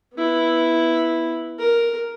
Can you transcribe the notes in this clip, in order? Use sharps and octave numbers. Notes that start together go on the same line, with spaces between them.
B3 E4
A#4